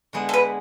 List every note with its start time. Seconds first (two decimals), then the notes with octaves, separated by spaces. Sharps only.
0.13 D3 G#3 B3 E4
0.29 A4
0.34 B4